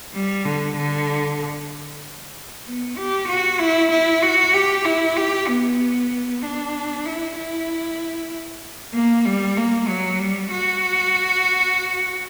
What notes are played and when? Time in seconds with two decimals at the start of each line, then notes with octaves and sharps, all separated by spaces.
0.14 G3
0.45 D3
0.77 D3
2.66 B3
2.97 G4
3.28 F#4
3.60 E4
3.91 E4
4.22 F#4
4.54 G4
4.85 E4
5.17 G4
5.48 B3
6.42 D4
7.06 E4
7.37 E4
8.94 A#3
9.25 G3
9.57 A#3
9.88 F#3
10.20 G3
10.51 F#4